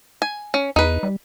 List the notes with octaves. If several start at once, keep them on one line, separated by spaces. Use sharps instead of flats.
G#5
C#4
E2 D#4 B4
G3